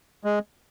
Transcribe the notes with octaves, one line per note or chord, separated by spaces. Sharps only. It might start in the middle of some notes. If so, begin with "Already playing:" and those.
G#3